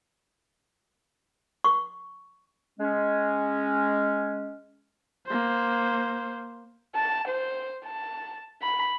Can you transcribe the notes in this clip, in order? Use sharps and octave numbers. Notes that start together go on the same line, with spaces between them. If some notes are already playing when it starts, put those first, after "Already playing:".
C#6
G#3 C#4
A#3 C5
A5
C5
A5
B5